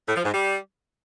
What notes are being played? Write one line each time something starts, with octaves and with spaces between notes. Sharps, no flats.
A2
F3
G#2
G3